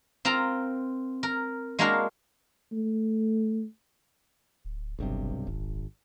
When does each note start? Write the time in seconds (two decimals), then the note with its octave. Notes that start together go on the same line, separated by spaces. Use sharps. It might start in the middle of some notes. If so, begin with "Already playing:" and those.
0.25 C4 F4 A#4 A#5
1.23 A#4
1.79 G#3 A#3 D4 F#4 A#4 F5
2.72 A3
4.65 D1
4.99 F#1 B1 G2 C3
5.47 D#1 G#1